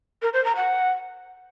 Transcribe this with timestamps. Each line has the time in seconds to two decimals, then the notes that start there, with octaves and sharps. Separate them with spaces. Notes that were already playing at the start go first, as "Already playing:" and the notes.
0.22 A#4
0.33 C5
0.45 A#5
0.56 F#5